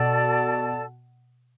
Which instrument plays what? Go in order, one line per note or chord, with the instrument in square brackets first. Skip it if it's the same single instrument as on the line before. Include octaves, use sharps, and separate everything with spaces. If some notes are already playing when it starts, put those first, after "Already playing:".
Already playing: [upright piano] B2 [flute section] A4 D5 A5